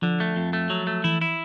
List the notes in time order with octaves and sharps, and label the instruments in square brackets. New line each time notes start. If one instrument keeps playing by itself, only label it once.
[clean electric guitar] D3 [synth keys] F3
[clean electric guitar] A3
F2
A3
F#3
A3
[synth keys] E3 [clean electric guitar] E4
[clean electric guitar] E4